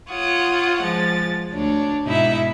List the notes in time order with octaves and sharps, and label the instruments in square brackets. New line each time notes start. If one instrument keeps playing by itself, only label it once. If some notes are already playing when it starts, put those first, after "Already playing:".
[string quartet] F4 C#5 F#5 D#6
F3 G#3 A6
D2 D4 C#5
G#2 B2 D#4 E4 E5